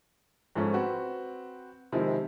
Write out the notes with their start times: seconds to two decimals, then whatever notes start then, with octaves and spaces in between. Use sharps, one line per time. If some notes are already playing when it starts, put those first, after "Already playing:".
0.55 G#2 F3 A3 C#4
0.74 C4 F#4 B4
1.92 C3 D#3 F3 G#3 E4